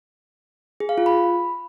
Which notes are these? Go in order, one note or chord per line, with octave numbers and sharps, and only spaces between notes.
G#4
F5
F4
B5